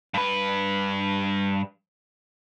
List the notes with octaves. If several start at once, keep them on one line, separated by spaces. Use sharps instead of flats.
G2 B4